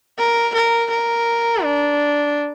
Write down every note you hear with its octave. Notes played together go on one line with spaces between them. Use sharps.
A#4
A#4
A#4
D4